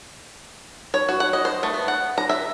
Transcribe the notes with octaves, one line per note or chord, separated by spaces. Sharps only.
C#5
F#4
F#5
D#5
C5
A3
B3
F#5
A#5
E5